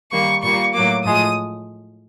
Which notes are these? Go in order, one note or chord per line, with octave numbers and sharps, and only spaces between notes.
D#3 G3 A#3 C#6
A#2 G3 A#3 C#6
A2 F#3 A#3 D6
A2 F3 G#3 D#6